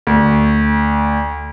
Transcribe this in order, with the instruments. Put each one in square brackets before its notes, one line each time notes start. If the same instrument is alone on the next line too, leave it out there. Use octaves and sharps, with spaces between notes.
[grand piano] D2